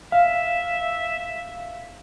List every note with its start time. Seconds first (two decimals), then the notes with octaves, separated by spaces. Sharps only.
0.12 E5 F5